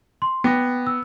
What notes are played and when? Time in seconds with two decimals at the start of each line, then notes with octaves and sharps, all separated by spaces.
0.22 C6
0.44 B3 G5 D6 A#6
0.87 E6